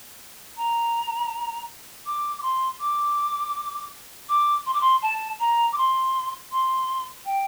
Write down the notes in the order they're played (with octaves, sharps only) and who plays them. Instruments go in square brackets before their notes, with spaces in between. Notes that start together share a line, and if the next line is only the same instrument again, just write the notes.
[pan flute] A#5
D6
D6
C6
D6
D6
C6
D6
C6
A5
A#5
D6
C6
C6
G5